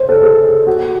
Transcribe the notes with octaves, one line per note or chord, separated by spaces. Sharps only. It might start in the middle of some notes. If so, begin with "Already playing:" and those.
Already playing: C5 C#5
A4
G#4
F#4